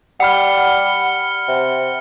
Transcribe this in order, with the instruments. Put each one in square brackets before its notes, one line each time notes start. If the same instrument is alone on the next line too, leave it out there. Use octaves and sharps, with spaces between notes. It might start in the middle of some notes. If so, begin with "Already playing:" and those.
[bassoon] G3 [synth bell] F#5 B5 [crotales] F6 C#7
[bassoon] C3